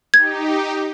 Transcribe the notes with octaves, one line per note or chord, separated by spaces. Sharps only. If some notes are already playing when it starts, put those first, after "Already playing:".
D#4 G4 G#6